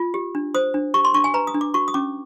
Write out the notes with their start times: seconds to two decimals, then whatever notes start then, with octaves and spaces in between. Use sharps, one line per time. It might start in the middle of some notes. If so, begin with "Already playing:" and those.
Already playing: F4
0.14 G4
0.35 D4
0.54 C5 D#6
0.74 D4
0.94 G4 C#6
1.05 C6
1.14 D4 C#6
1.24 G#5
1.34 B4 A#5
1.47 D#6
1.54 D4
1.61 D6
1.74 F#4 C#6
1.88 D#6
1.94 C#4 D6